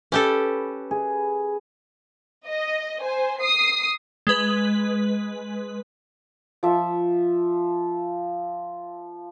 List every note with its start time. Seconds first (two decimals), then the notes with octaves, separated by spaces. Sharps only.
0.12 C#4 G4 A4 B4
0.91 G#4
2.47 D#5
3.02 C5 G#5
3.41 D#6 C7
4.27 G#3 B4
6.63 F3 E5